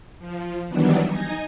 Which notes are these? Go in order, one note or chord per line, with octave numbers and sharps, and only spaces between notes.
F3
D#3 E3 F#3 G3 B3 D4
D#4 D#5 G#5